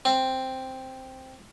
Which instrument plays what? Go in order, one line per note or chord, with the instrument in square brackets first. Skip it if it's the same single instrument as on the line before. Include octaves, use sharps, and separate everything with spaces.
[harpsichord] C4